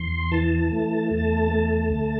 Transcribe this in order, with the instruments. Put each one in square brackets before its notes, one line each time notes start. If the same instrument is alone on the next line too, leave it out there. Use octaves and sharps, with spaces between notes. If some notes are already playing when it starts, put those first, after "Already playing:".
Already playing: [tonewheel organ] E2 C6
E3 A5
A3
E2
A3
D2